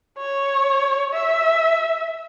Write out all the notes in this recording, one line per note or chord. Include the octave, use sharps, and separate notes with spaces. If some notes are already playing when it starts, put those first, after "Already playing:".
C#5
E5